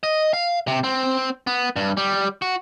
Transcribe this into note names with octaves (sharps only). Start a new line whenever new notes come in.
D#5
F5
C3
C4
B3
G2
G3
F#4